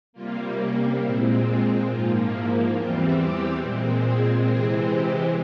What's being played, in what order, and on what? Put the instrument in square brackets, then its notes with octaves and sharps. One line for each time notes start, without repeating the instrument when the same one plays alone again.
[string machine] C3 G3 A#3 F4
C#4
A#2 G#3 C4 E4
F4
G#2 F3 A#3 F4
E4
E2 E3 G3 C4 F4
G4
A#2 G#3 C4
G#4
C3 E3 G#3 C4 G#4
G4